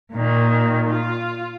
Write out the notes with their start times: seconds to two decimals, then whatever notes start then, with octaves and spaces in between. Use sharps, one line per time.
0.12 A#2 D#3
0.89 F4